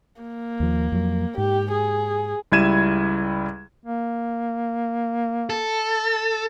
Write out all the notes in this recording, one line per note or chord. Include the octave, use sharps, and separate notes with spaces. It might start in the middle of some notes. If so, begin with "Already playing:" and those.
A#3
D#2 F3
F2 F#3
G#2 G4
G#4
C#2 G3 E4 G#6 D#7 E7
A#3
A4